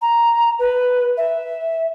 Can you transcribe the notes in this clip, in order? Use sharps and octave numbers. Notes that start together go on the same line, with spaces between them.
A#5
B4
E5